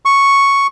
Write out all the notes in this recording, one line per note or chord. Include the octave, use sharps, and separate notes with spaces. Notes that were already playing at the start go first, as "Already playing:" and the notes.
C#6